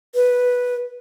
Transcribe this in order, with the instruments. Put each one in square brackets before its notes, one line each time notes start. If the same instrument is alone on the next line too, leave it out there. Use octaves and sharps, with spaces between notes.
[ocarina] B4